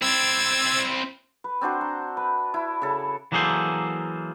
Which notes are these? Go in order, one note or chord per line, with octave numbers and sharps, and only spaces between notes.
C4 E4 E6 G#6 A6
B4
C4 D4 F#4 C5
A#5
B4
E4
C#3 A4
E3 F#3 A#3 G#4 A4 C5